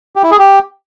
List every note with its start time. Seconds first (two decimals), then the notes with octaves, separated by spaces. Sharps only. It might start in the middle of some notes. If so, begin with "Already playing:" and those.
0.16 G4
0.23 E4
0.31 G#4
0.39 G4